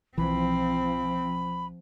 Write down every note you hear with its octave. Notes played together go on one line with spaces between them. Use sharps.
B1 E3 F3 C4 B5